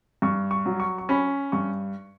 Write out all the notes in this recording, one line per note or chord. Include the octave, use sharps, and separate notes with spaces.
G2 C#6
C#6
F#3
C#6
C#6
C#4 B5
G2 C#6